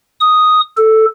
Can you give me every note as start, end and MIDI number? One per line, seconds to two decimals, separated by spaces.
0.20 0.60 87
0.77 1.05 69